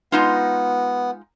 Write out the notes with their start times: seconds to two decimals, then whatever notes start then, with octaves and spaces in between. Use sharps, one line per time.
0.12 G#3 B3 D#4 F4